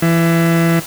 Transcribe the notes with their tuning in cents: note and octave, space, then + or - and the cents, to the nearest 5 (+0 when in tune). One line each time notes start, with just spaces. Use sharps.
E3 +20